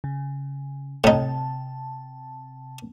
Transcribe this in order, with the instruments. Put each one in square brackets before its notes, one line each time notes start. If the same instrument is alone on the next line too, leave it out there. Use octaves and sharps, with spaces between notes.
[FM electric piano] C#3
[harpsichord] A2 D#4 [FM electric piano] C3 A5